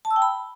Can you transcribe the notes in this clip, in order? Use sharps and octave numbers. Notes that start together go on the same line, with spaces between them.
A5
E6
G5
B5